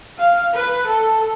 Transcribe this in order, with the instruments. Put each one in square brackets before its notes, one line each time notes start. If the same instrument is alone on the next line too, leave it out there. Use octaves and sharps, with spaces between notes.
[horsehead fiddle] F5
B4
A4